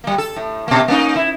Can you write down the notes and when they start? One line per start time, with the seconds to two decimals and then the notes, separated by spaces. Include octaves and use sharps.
0.04 G3 A#3
0.18 A4
0.36 A2
0.68 B2 A#3
0.88 A#3 C#4 D#4
1.16 E4